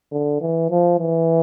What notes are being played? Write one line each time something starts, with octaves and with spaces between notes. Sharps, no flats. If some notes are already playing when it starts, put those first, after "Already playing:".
D3
E3
F3
E3